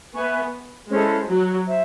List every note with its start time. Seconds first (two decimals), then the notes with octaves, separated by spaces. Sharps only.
0.15 B3 B4 E5 G#5 C#6
0.91 G#3 C#4 E4 A4 C5
1.29 F#3
1.66 C5 E5